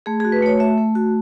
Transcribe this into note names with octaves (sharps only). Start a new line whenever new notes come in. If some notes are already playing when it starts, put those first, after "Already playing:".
A3 G#4
G#4
F#4
B4
A3 C#5
A3 E5
A3
F#4